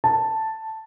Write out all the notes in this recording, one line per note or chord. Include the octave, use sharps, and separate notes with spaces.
A5